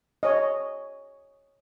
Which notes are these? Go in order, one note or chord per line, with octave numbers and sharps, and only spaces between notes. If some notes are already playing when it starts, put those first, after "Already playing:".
C#5 D#5